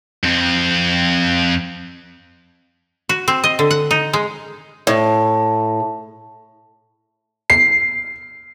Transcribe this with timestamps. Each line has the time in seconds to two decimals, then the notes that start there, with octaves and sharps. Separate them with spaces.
0.24 F2 C4
3.09 F#4
3.28 C4
3.44 D#5
3.59 D3
3.71 F#5
3.91 D#4
4.13 G#3
4.87 A2
7.50 C7